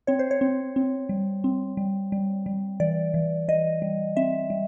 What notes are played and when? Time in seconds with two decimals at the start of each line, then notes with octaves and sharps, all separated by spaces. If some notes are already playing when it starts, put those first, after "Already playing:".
0.07 C4 C#5
0.19 C5
0.31 C#5
0.41 C4
0.76 C4
1.09 G3
1.44 C4
1.77 G3
2.12 G3
2.46 G3
2.80 E3 D5
3.14 E3
3.48 E3 D#5
3.82 G3
4.16 C4 E5
4.50 G3